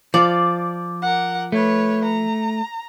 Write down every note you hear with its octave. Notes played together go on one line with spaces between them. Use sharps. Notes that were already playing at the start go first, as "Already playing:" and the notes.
F3 D5
A#4 F#5
A3 B4 C#5
A#5